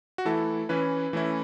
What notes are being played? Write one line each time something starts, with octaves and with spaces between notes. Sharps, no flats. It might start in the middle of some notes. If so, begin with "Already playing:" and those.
F#4
E3 A3 E4 A4
E3 C#4 E4 B4
E3 A3 C#4 E4